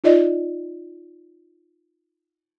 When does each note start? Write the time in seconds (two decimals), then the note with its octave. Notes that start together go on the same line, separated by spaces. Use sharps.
0.04 D#4 F4 D5 D#5